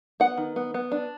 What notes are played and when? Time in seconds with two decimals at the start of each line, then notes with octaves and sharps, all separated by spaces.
0.20 B3 F#5
0.37 D#3
0.56 B3
0.74 B3
0.92 D4